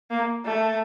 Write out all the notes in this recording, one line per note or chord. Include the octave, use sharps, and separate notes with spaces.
A#3
A3